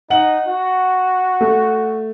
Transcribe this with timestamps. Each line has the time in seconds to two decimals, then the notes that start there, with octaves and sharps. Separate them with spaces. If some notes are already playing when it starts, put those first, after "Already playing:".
0.10 D#4 F#5 F#7
0.49 F#4
1.41 A3